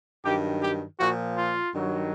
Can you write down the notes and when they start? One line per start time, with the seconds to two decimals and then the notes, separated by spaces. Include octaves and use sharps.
0.24 G2 D#3 F#3 G4
0.62 G4
0.99 A#2 F3 F#4
1.36 F4
1.74 G2 D#3 F#3